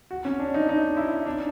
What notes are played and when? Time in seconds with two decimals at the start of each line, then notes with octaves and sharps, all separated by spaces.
0.11 F#4
0.25 C#4
0.40 D4
0.54 D#4
0.69 D#4
0.97 E4
1.26 D4